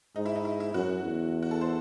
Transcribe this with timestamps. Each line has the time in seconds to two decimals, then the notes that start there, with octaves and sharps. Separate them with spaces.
0.16 G#2 D#4
0.26 E4
0.36 D#4
0.45 E4
0.60 E4
0.74 F#2 F#4
1.03 E2
1.42 F#4
1.51 A4
1.61 C5